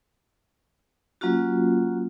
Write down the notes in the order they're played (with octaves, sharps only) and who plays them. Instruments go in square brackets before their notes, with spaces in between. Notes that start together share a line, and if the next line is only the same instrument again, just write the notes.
[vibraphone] F#3 A#3 C#4 F4 F#4